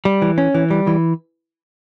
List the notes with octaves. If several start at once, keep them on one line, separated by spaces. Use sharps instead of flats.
G3
E3
C#4
E3
G3
E3